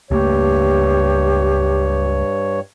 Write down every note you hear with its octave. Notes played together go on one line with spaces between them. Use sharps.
C#2 G2 A3 A#3 G4 C#5